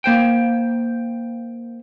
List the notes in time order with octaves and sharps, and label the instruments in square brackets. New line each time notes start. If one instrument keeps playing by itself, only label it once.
[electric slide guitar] A#3 C5 G5